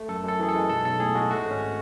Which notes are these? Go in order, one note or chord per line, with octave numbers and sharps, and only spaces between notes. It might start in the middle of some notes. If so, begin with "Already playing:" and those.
Already playing: A3
F#2 A4
F#2 A4
E3 G#4
A4
G#3
B1 A4
B1 A4
A2 G#4
G#3 F#4
A3 F#4
G#1
C#4